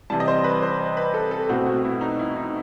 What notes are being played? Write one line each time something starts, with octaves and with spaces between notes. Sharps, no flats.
C3 E3 G3 A5
D#5
C5
B4
C5
B4
A4
A4
B2 A3 C4 F#4
F#4
E4
D#4
E4
D#4